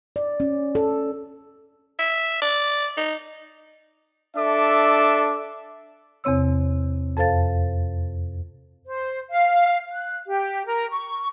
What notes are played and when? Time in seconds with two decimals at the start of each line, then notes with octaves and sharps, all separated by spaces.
0.16 D5
0.40 C#4
0.75 A4
1.99 E5
2.42 D5
2.97 D#4
4.36 D4 A4 E5 D6
6.24 E2 C3 C4 C#5 E6
7.17 F2 A4 C5 F5 A6
8.86 C5
9.30 F5
9.92 F#6
10.27 G4
10.65 A#4
10.90 C#6